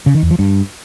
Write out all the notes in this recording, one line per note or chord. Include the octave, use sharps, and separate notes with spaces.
C#3
D#3
E2
F3
G2